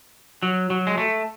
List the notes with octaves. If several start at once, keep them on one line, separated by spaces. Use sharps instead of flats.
F#3
F#3
G#3
A3